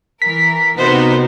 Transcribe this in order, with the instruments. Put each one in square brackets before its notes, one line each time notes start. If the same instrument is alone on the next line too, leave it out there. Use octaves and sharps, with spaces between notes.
[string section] E3 A#4 [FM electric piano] B6
[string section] C3 B3 [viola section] D#4 F#4 A#4 [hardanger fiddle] C5